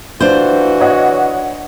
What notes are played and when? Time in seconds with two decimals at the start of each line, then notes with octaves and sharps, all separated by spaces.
0.21 E3 D4 F4 F#4 C5
0.80 C#5 D#5 F#5